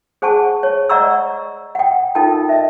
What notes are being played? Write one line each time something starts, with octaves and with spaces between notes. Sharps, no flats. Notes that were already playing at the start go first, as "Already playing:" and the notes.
G#4 C5 F#5 G#5 A5 C#6
C#5
D5 D#5 F#5 A#5 C#6 E6
F#5 G5
D#4 F4 A4 A#4 G5 A5
D#5 E5